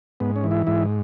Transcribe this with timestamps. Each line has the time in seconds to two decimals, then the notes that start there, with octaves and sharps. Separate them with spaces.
0.20 G#2 B3
0.36 C#4
0.44 E3
0.51 E4
0.67 G#2 E4